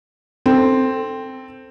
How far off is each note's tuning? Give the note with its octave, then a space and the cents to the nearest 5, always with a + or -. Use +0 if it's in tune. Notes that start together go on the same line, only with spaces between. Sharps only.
C4 +0 A4 +10